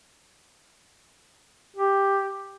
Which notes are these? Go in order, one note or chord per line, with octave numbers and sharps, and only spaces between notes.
G4